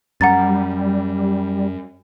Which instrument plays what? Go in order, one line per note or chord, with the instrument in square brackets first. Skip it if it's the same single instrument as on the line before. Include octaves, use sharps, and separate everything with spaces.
[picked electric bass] F#2 [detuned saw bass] G3 [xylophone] F#5 A#5 A6